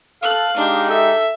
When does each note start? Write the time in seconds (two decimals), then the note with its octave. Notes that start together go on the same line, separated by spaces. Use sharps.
0.23 A4 F5 F#6
0.57 G#3 D4 D#4 G4
0.90 A4 E5